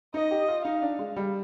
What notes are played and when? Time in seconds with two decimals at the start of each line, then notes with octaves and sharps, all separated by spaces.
0.14 D#4 D#5
0.31 G4
0.48 F4
0.65 D#4 F5
0.82 D4
0.99 G#3
1.16 G3